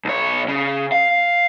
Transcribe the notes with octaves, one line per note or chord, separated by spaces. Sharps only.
B1 C#5
C#3
F5